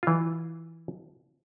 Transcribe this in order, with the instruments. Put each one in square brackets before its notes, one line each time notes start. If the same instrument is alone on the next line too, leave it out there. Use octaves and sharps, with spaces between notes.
[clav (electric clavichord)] E3 F4